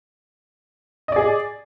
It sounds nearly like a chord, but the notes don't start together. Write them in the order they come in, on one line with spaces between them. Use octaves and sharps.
D#5 D5 G#4